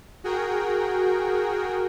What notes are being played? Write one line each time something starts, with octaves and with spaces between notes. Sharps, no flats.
F#4 G#4 A#4 G5